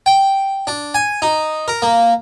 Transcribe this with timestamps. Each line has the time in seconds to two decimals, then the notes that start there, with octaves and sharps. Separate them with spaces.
0.06 G5
0.67 D4
0.94 G#5
1.22 D#4
1.68 A#4
1.82 A#3